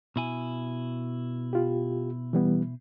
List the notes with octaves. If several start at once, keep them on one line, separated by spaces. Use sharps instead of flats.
B2 E4 G#5
F4 G4
E3 G3 B3